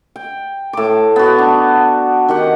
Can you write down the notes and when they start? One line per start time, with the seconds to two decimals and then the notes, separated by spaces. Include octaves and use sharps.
0.16 G5
0.73 A2 D6
1.16 B3 F#4
1.38 D4
2.28 D#3 G4 F#5